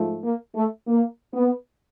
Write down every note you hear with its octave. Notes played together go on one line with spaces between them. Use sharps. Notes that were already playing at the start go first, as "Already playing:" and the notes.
Already playing: G#2 F3 A3
A#3
A3
A#3
B3